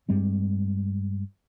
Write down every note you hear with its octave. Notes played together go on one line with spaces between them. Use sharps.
G2 G3 G#3 C4